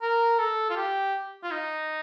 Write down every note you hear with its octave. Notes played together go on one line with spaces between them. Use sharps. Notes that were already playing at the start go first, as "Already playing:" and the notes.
A#4
A4
F4
G4
F4
D#4